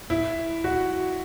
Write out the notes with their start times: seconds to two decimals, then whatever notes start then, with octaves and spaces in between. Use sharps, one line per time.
0.10 E4
0.64 F#4